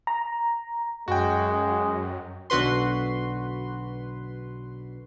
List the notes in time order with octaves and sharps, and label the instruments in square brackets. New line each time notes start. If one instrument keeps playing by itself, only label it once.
[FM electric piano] A#5
[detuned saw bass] F#2 [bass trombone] G#3 [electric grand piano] F#4 G5
[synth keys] B1 D3 F#4 B4 C6